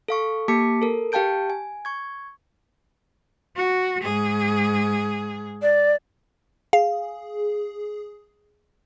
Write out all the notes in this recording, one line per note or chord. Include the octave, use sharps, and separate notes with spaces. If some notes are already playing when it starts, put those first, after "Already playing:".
A4 F5 C#6
A#3 G4 A5 D6 B6 C#7
A4 A#4
G4 F5 G5 A5 G6 D7
G#5
C#6 G#6
F#4
G#2 G#4
D5
G#4 F5